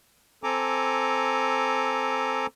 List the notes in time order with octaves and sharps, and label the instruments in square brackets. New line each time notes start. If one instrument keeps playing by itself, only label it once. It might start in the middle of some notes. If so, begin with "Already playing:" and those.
[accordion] C4 A4 G#5 A#5 D6